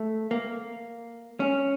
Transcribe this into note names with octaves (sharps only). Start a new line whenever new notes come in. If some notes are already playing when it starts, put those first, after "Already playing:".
Already playing: A3
A#3
C#4